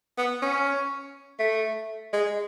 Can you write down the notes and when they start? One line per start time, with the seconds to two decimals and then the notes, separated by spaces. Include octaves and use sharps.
0.18 B3
0.42 C#4
1.39 A3
2.13 G#3